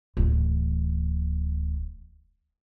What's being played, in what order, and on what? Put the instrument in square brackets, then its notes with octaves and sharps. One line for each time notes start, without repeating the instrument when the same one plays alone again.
[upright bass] D1 E3